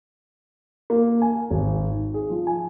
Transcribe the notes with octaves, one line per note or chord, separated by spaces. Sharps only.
A#3
G#5
G#1
D#4
G#4
F3
G#5